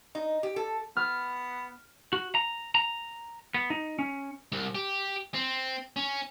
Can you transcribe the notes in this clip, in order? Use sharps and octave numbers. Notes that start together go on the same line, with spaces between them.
D#4
G4
A4
B3 F6
F#4
A#5
A#5
B3
D#4
C#4
C2
G4
C4
C#4